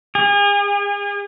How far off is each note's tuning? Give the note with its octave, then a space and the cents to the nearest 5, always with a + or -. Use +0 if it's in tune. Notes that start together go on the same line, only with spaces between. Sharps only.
G#4 -40